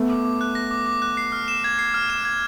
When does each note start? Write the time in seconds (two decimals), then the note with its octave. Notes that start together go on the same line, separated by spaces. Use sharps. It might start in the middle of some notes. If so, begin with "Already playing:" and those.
Already playing: A3 B3
0.10 D6
0.25 D6
0.41 F#6
0.55 A#6
0.71 D6
0.86 D6
1.02 F#6
1.17 C7
1.32 F6
1.48 E7
1.64 G#6
1.79 C7
1.94 F6
2.10 E7
2.25 G#6